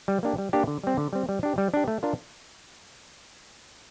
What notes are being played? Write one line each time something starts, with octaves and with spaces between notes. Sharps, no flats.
G3
A#3 D4 G4
G3
A#3 D4 G4
D3
G3 C4
D3
G3 C4
G3
D4 G4
G3
D4 G4
A3
D4 F4 A#4